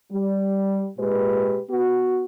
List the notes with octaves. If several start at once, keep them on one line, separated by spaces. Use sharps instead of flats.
G3
A#2 G#3 G4 B4
B3 F#4